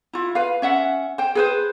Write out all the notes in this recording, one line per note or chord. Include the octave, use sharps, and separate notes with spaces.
E4 F4
B4 F5
C#4 E5 F#5
C5 G5
G#4 B4 C5